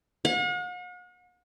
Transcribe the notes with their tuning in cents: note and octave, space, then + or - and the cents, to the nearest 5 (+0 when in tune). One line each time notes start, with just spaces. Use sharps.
F#5 -45